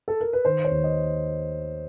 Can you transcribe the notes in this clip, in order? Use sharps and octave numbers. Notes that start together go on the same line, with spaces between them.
A4
A#4
B4
D#3 C5
C#5
D#2
D#5